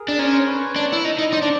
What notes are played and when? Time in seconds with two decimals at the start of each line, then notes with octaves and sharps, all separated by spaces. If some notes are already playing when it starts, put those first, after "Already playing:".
Already playing: G#4 A#4
0.08 D4
0.19 C#4 A#4 C5
0.33 A#4 C5
0.47 B4 C#5
0.76 D4
0.92 E4
1.05 D#4
1.18 D#4
1.32 D#4 C5 D5
1.42 D4